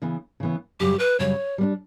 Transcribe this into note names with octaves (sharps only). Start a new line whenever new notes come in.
C#3 E3 B3
C#3 E3 B3
F#2 C#3 G3 G4
B4
F#2 C#3 G3 C#5
G3 B3 D4